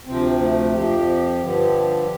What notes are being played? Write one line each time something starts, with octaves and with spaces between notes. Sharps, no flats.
D2 C3 F3 C4
A3
F2 F3 G4
G2 D3 F3